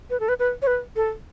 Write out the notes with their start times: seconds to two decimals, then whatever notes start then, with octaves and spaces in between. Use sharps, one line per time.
0.10 B4
0.20 A4
0.29 B4
0.39 B4
0.62 C#5
0.67 B4
0.96 A4